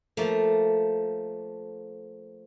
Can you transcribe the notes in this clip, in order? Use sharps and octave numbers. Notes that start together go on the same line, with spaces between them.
F3 A3 A#3